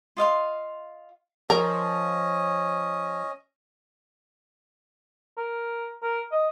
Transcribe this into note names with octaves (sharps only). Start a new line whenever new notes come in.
F4 D#5 F5 C6
F3 C#4 A#4 D#5
A#4
A#4
D#5